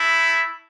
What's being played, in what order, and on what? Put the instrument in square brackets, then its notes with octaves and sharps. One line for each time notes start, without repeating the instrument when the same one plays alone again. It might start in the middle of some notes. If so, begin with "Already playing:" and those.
Already playing: [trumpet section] A3 E4